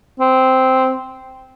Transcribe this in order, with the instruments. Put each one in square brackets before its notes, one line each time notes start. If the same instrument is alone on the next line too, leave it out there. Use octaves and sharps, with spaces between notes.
[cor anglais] C4